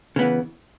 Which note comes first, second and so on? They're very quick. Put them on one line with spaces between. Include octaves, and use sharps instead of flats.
C#3 B3 E3